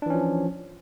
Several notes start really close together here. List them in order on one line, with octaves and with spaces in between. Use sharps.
D4 E3 C#4 F3